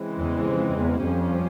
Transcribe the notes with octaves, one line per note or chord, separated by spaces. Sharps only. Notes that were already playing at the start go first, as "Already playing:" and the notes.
Already playing: C#3 E3 G#3 C4
E2
F2
E2
F2 G3 C#4 G4 C5